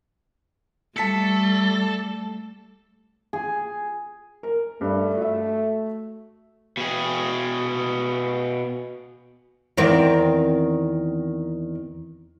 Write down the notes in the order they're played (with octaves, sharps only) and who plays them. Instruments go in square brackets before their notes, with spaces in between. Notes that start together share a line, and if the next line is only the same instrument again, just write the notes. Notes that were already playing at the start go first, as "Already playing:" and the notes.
[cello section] G3 [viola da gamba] A3 [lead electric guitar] A4 [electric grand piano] A5 B6 C#7
[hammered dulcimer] G#4
[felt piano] A#4
[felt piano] G2 [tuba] A3
[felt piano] F#4 E5
[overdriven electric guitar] B2 G#4
[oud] E2 D#3 C4